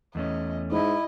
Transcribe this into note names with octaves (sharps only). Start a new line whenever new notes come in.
E2 A3 C#4 D#5
G#2 E4 D#5